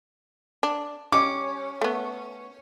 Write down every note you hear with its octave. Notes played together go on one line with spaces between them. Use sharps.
D4
G3 C#4 D6
A3 B3